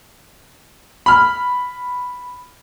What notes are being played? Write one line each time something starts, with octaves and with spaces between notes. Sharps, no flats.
B5 F6